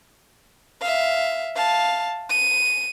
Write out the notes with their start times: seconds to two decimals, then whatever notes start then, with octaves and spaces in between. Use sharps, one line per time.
0.81 E5 F5
1.56 F5 A5
2.30 D#7